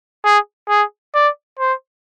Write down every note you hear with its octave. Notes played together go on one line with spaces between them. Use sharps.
G#4
G#4
D5
C5